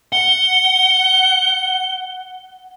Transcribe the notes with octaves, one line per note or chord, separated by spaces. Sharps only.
F#5 G7